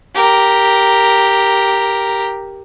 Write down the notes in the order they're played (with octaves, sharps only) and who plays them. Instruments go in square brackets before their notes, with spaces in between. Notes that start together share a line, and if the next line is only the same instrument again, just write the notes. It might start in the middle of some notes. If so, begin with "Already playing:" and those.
[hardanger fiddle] G4 A#4